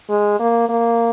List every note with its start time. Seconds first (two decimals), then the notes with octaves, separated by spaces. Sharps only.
0.09 G#3
0.40 A#3
0.69 A#3